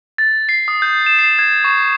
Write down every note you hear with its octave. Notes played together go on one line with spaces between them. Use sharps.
A6
C7
D#6
G6
E7
C7
G#6
C#6